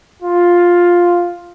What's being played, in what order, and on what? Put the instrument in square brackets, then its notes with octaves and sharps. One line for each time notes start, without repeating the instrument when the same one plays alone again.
[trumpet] F4